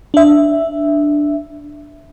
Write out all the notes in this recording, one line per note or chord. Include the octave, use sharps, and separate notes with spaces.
D4 E5